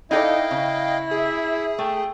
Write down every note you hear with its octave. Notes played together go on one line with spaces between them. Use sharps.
D#4 E4 A4 D5 D#5 F5 G5
C#3
G#4 E5
A3 G5